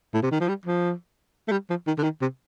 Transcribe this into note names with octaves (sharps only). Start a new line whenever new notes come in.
A2
C3
D#3
F3
G3
F3
A3
G3
F3
D#3
D3
D#3
C3